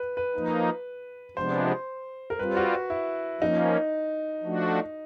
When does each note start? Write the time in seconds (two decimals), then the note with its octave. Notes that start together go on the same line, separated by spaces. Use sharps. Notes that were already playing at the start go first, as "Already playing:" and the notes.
Already playing: B4
0.17 B4
0.34 F3 A#3 D#4
1.36 C3 F3 G#3 B3 D4 C5
2.30 A#4
2.38 G3 C4 F4 B4
2.57 F#4
2.90 E4
3.41 F3 A#3 C#4 D#4
4.44 F3 A3 D4 F#4